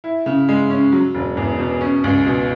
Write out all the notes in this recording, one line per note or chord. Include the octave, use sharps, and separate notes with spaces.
E4
C#3
G#3
C#4
F#3
E1
E2
B2
C#4
C#2
B2